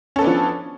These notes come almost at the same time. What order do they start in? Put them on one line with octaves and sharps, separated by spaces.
C#4 A4 B3 D4 F3